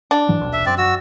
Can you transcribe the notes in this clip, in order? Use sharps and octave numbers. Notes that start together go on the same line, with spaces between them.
D4
G#2 E3 F#3
D#1 B1
E5
F#2 C4 D5
F#4 E6